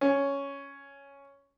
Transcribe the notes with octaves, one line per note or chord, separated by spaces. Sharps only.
C#4